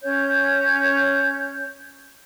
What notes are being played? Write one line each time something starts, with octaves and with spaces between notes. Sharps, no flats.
C#4 C#5 G6